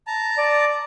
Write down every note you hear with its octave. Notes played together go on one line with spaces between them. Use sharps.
A5 A#5
D5